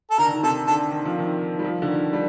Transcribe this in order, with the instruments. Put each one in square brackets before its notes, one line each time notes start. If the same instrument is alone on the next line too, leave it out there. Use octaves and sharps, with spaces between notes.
[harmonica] A4
[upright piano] D3 [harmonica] A#4
[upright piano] D#3
D3
[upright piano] C3 [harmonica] A4
[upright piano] D3 [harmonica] A4
[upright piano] D#3
F3
D#3
G3
F3
D3
D#3
G3